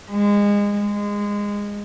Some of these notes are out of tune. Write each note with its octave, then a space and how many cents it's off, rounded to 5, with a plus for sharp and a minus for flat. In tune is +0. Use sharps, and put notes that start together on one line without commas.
G#3 -25
G#3 -20